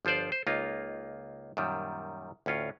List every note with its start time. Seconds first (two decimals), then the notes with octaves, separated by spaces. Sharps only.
0.05 G1 F3 F4 C5 D5
0.32 C5
0.47 C#2 A#3 D#4 F4
1.57 F#2 A#2 D#3 G3
2.46 D2 A2 C#4 F4